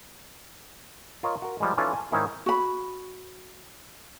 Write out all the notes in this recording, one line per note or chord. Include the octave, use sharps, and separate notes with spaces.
F4 A#4 C#5 D#5
F#4 A#4
F3 G3 G#3
E3 C#4 D#4 F4 A4 D5
G#5 A5
G#2 D#3 C#4 D#4 E4 G#4
F#4 B5